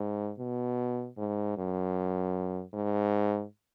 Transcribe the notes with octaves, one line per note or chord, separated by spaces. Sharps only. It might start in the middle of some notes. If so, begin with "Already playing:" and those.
Already playing: G#2
B2
G#2
F#2
G#2